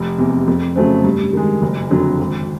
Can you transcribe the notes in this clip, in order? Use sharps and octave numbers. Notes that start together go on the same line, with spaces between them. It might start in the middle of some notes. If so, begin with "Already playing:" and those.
Already playing: F1
E2 C3
F2
C#3 F#3 A3 C4
G2
D#3 G#3
F#1
F2 D3 F#3
G#1